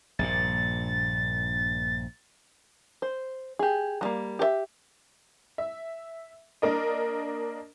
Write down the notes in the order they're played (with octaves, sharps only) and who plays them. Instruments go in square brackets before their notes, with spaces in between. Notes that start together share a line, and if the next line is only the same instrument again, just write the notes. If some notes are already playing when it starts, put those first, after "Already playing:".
[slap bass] A#1 G2 A#2 [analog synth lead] A6
[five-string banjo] C5
G4 G#4
F#3 G3 A#3
G4 A#4 E5
[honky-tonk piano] E5
A#3 D4 A#4 D#5